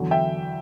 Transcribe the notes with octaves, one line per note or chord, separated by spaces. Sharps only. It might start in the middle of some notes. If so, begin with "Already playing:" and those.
Already playing: E2 D3 F#3
E5 G5